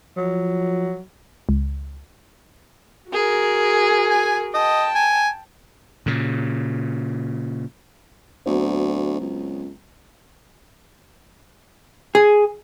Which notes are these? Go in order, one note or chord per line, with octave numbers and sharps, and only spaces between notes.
F3 F#3
C#2
F#4 G#4 A#4
G#5
D#5 G5 A5
G#5
A#2 C#3
D2 F#3 B3 C4
C#2
G#4